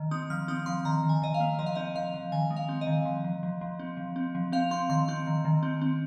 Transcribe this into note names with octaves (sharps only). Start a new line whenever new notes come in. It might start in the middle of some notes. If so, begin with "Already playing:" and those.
Already playing: D#3
C4 D#6
F3 F6
C4 D#6
F3 C6
D#3 A#5
D#3
G#5
D#3 D#5
F5
A#3
F3 D#5
F5
C4 D#5
F3 F5
F3
D#3 G#5
G#3
F5
C4
D#5
D#3
F3
F3
F3
F3
C4
F3
C4
F3
C4 F5
C4 C6
D#3 C6
C4 C6
D#3
D#3
C4
C4